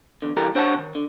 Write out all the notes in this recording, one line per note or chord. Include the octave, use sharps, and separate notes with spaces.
E2 D3
C2 E3 G4 A4 A#4 A#5
D4 C5 C#5 F#5 G5 A5
C3 D#3
D3